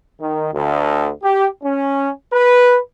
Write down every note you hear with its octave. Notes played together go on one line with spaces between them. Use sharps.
D#3
D2
G4
C#4
B4